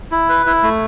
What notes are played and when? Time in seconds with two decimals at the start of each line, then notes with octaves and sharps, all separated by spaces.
0.12 E4
0.29 B4
0.46 E4
0.63 A3